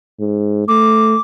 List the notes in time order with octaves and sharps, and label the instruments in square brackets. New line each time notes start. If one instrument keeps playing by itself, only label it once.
[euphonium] G#2
[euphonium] A3 [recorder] D6